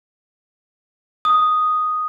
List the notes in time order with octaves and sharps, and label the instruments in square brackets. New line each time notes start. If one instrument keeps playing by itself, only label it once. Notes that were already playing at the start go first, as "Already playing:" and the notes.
[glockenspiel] D#6